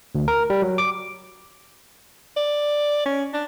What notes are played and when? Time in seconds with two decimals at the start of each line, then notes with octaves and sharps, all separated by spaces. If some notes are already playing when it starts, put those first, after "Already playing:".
0.15 D2
0.28 A#4
0.50 G3
0.62 F#3
0.78 D6
2.37 D5
3.06 C#4
3.33 D4